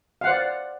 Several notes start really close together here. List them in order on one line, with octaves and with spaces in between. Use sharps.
F5 F#5 C5 D5